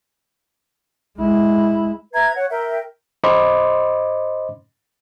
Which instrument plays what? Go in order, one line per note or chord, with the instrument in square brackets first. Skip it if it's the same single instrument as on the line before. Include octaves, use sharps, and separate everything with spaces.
[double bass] G#3 E4
[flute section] B4 E5 A#5 G#6
C#5 F#5
A#4 E5 G5
[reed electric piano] C5 D#5 B5 C6 D6